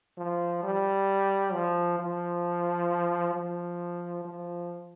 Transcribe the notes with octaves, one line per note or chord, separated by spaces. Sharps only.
F3
G3
F3
F3
F3
F3